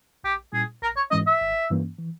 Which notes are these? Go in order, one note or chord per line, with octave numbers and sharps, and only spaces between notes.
A#1 G4
A#2 G3 C#4 E4 G#4
A#1 A#4
C#5
G#2 E3 G#3 C#4 D#5
E5
G#1
G2 E3 A#3 C#4
E3